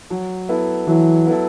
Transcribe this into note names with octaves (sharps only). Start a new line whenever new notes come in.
F#3
B3 E4 A4
E3 F#3
B3 E4 A4